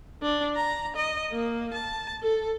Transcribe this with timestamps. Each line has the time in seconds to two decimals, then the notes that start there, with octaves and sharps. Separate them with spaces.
0.22 D4
0.56 A#5
0.96 D#5
1.32 A#3
1.74 A5
2.22 A4